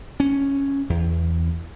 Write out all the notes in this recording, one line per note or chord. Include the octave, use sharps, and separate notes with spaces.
C#4
E2